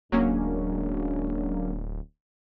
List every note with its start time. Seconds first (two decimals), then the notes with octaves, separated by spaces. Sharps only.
0.12 D1 F#2 F#3 G#3 A#3 C#4 D4